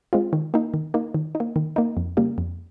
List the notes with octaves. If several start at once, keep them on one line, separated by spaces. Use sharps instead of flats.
G#3 C4 F4
D#3
A#3 D#4
D#3
A#3 D#4
D#3
D#4
A#3
D#3
A#3 D#4
F2
C#3 G3 A#3
F2